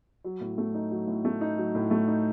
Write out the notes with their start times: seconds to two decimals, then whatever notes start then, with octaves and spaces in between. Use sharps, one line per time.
0.24 F#3
0.41 A2
0.58 A3
0.74 D#4
0.91 F#3
1.07 A2
1.25 A3
1.41 D#4
1.58 F#3
1.75 A2
1.91 A3
2.08 D#4